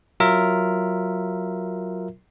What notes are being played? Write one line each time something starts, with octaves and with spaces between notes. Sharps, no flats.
F#3 F4 A#4 E5